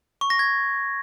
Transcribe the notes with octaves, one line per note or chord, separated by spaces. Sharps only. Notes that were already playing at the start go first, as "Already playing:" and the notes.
C#6
A#6
G#6